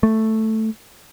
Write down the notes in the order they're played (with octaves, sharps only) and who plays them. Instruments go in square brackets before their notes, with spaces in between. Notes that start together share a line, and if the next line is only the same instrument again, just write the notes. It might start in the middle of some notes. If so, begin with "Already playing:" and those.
[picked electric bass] A3